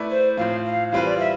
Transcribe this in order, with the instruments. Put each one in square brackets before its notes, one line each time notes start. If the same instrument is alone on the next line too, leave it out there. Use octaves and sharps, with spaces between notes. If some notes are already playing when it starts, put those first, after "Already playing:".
Already playing: [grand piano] A3 E4 B4 D5
[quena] C5
[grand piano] A2 F3 C4 [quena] F5
[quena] F5
[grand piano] E3 G3 C4 F4 B4 [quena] F5
[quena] D5
E5